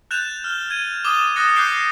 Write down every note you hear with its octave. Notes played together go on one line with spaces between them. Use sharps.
F#6 G6 A6 E7 F7
F6 G7
G#6 D#7
D6 D#6 A6 E7 G7
D#6 F#6 A6 A#6 C#7
D6 F#6 G6 C7 D7 G7